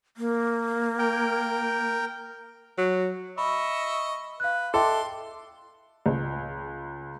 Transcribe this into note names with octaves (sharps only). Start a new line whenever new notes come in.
A#3
A#4 G5
F#3
D#5 E5 B5 C#6
B4 F5 F#6
A4 D#5 E5 G5 C6 D6
C#2